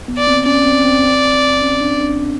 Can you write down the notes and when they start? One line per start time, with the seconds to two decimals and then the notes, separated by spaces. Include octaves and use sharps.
0.08 B3
0.18 D5
0.27 C4
0.46 C#4 D5
0.66 C4
0.85 C4
1.04 C4
1.61 C#4
1.81 D4
2.01 D4